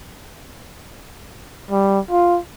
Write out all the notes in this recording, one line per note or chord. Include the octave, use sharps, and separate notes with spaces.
G3
F4